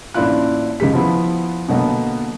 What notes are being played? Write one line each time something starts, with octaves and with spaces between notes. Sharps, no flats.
A1 A#3 D4 E4 F4 F#6
C#2 D#3 G4 G#4 B6
F3 B3 E4
B2 D3 F#3 A#3 B3